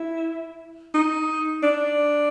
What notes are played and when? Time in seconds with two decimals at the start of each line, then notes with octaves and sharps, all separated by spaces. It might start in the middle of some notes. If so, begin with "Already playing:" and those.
Already playing: E4
0.94 D#4
1.63 D4